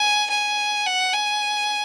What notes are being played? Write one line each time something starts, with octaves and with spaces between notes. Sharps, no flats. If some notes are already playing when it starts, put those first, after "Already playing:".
Already playing: G#5
G#5
F#5
G#5